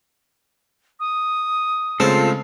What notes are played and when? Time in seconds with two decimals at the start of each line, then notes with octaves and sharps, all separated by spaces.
1.00 D#6
2.00 C#3 G#3 A3 C4 F4 A4